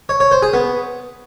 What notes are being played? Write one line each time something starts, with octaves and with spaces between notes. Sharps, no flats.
C#5
C#5
C5
G#4
B3